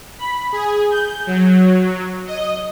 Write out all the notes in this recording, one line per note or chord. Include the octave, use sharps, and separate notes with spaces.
B5
G#4
G6
F#3
D#5